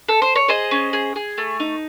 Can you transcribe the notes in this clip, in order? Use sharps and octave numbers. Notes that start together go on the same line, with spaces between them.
A4
C5
C#5
G#4 C5 D#5
C#4
G#4
G#4
A3
D#4